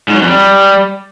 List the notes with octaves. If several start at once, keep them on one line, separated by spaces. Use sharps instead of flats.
G#2
F#3
F2
G3